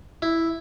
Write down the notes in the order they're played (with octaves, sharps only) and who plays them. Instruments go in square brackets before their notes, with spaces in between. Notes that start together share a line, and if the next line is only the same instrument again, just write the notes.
[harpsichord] E4